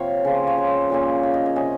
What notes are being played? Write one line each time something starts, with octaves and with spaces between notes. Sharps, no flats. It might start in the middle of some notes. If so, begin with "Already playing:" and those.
Already playing: C3 F3 A#3 C#5 F5 G5
C#3 F3 A#3
C#5
C5
A#2 F3 A#3 C#4
C#5
D#5
D#5
C3 G3 C#4 D#5